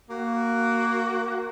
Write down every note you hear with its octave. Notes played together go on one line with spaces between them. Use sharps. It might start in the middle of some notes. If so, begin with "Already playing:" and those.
A#3 F#4